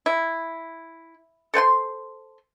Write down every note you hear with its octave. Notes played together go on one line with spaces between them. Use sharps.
E4
A4 C5 G5 C6